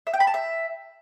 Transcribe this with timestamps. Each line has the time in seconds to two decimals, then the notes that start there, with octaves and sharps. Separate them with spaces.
0.07 E5
0.13 G5
0.20 B5
0.27 A5
0.34 E5